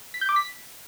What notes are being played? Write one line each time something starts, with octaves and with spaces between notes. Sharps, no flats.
B6
G6
D6
B6